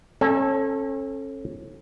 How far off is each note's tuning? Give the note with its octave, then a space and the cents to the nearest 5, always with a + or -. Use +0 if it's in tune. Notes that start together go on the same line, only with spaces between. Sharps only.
C#4 -35 A4 +0 G#5 +0